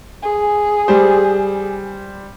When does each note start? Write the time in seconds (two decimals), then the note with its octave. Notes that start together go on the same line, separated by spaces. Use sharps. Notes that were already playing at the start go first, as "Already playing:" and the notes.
0.23 G#4
0.88 G3 C5